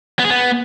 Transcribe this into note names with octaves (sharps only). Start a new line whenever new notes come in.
B3
G#4
B3